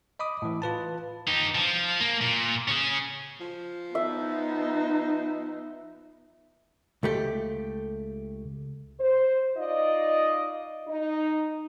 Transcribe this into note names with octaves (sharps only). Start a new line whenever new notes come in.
D#5 B5 D6 D#6
A2 E3
F4 B4 A5
D#4 G4
F3
A#3
A#2
C#4 G#4
F3
B3 D#4 E5
C#2 A3 G4
C5
D#4 F4 D5 D#5
D#4